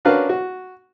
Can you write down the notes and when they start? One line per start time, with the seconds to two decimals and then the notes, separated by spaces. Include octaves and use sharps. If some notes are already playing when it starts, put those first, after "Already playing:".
0.05 C#4 D4 F#4 A#4 B4 F5
0.29 F#4